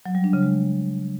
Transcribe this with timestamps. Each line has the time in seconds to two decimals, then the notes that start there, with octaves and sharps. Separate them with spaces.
0.06 F#3
0.15 G3
0.24 D4
0.33 C#3
0.43 G#3